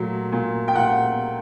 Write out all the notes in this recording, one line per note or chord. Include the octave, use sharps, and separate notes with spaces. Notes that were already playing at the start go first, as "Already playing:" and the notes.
Already playing: A#2 F#3 A3
A#2
G5
A#2 F#5